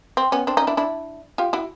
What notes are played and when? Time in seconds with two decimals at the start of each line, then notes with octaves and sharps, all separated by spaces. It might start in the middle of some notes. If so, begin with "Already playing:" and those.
0.17 C4
0.32 B3 C#4
0.47 C4 D4
0.57 C#4 D#4
0.67 D4 E4
0.77 D4 E4
1.38 F4 G4
1.53 E4 F#4